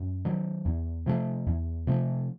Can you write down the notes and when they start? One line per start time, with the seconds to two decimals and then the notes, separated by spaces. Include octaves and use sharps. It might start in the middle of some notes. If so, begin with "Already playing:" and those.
Already playing: F#2
0.25 D#3 F#3
0.65 E2
1.06 C3 F3 A3
1.47 E2
1.87 C3 F3 A3